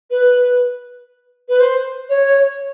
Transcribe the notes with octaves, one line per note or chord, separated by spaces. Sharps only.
B4
B4
C5
C#5